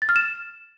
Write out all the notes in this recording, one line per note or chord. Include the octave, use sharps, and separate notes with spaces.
A6
F6
E7